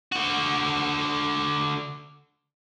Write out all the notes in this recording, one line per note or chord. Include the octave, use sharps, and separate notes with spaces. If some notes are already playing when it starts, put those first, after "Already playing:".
D3 F#4